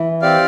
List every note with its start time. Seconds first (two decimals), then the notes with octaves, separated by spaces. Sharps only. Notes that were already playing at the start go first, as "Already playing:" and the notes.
Already playing: E3 E4
0.22 C4 G4 D5 F5